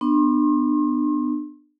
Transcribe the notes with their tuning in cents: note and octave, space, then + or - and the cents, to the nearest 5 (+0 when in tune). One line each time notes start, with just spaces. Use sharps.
B3 +10 D4 +35 C6 +35